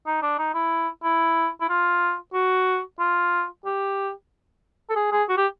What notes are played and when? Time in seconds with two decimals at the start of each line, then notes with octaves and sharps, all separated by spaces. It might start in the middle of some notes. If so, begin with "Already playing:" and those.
0.06 D#4
0.22 D4
0.38 D#4
0.54 E4
1.03 E4
1.61 E4
1.69 F4
2.34 F#4
2.99 F4
3.65 G4
4.90 A4
4.96 G#4
5.12 G#4
5.29 F#4
5.37 G4